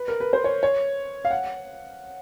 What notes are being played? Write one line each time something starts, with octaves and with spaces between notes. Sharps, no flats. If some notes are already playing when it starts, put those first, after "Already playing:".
Already playing: B4
A#4
B4
C5
C#5
C#5
F5
F#5